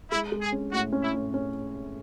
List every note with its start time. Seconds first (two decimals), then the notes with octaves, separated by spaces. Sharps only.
0.11 G#3 E4
0.32 G#3
0.41 G#4
0.52 C#4
0.72 A2 F#4
0.92 C#4
1.03 E4
1.14 A2
1.34 C#4